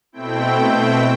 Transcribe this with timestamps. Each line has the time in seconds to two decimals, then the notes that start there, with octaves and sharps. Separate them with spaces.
0.12 B2 A3 C4 E4 G5